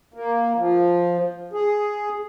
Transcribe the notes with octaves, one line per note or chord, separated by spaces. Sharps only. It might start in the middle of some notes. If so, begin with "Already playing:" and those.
A#3
F3
G#4